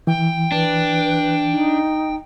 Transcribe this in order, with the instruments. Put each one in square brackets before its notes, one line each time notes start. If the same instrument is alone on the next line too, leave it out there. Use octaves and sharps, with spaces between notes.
[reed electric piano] E3 [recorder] G5
[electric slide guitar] D4 [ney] B4
[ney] D#4